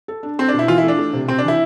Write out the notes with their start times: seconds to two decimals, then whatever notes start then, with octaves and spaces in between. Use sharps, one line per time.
0.08 A4
0.23 D4
0.39 C4 A4
0.48 D4
0.54 B2
0.59 E4
0.68 E3 F4
0.78 E4
0.83 A3
0.88 D4
0.98 A3
1.13 C3
1.28 C3 C4
1.39 D4
1.43 E3 E4